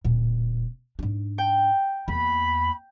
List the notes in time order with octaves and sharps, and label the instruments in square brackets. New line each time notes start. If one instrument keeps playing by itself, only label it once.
[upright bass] D1 A#2
G#2 D4
[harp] G5
[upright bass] E2 A#3 [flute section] B5